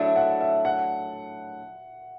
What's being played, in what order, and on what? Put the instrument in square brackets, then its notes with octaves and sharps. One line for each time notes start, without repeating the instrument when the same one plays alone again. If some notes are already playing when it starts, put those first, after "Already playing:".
Already playing: [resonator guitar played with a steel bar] A2 F#3 A3 D4 [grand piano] D5 E5
[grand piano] F#5
E5
F#5